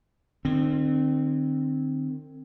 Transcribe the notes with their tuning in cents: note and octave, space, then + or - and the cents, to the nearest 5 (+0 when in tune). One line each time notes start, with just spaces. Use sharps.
D#3 -45 C4 +0